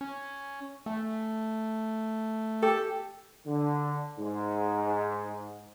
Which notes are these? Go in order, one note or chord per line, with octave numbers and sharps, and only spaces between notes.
C#4
A3 A5
G4 A4
D3
G#2